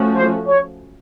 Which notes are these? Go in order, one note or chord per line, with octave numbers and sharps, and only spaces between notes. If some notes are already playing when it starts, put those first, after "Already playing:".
Already playing: F3 A3 C#4 F#4
C5
C#5